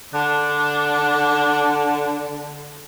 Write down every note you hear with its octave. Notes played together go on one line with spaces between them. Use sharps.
D3 D4